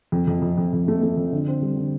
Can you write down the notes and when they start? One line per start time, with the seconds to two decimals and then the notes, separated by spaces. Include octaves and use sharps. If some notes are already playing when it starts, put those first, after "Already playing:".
0.12 F2
0.27 F2
0.42 F2
0.58 F2
0.73 F2
0.88 A3
1.02 A3
1.17 F2
1.32 D3
1.47 C4
1.62 G3
1.77 D3